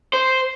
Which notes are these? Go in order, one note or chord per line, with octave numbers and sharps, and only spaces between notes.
C5